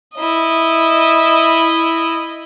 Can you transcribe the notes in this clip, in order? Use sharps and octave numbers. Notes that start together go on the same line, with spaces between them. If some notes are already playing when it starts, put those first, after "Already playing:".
E4 D#5